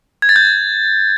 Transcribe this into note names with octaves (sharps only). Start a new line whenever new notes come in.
G#6
A6
G6